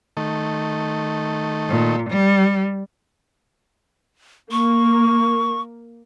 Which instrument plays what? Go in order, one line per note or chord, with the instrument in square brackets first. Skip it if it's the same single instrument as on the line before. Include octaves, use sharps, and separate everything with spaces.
[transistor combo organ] D#3 A3
[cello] A#2
G3
[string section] A#3 [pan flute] C#6